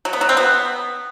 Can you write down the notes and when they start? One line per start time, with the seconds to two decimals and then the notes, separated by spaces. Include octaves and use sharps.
0.05 F#3
0.13 B3
0.21 F#3
0.29 C4
0.37 B3